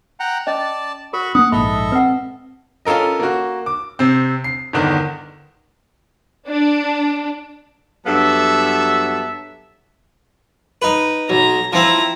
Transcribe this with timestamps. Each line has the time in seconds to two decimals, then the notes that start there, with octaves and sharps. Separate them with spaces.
0.20 F#5 G5 A#5
0.47 C#4 D5 D#5 A5
1.13 F#4 A#4 B5 C#6
1.35 A#3 C#4 F#5 D#6
1.52 A#1 G#2 A4 D#5 E5 B5
1.92 C4 B4 F#5
2.85 C#4 F4 A4 A#4 D#5
3.19 A#3 F#4
3.66 D6
3.99 C3 C4
4.44 C7
4.73 G1 E2 D3 D#3
6.47 D4
8.06 G2 F#3 B3 A4 E5 A5
10.82 D#4 B4
11.30 B1 A#5
11.73 F3 C4 E4 A#5